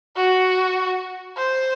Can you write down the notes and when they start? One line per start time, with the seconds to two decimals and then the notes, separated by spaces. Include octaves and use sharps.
0.15 F#4
1.37 C5